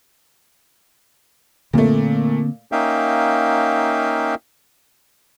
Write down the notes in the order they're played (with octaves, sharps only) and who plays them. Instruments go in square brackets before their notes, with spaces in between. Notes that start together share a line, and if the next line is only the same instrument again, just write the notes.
[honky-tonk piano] A#2 A3 [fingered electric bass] D3 A#3 C4
[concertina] A#3 C#4 D#4 E5 F5 G5